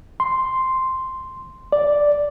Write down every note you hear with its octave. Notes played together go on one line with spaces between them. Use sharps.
C6
D5